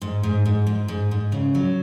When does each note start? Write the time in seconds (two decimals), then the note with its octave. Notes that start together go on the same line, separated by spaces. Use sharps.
0.02 G#2
0.23 G#2
0.45 G#2
0.67 G#2
0.88 G#2
1.11 G#2
1.32 C#3
1.55 F#3